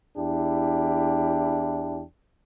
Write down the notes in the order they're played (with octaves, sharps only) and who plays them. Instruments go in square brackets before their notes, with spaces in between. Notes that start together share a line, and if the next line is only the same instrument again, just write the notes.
[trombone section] E2 D4 E4 G4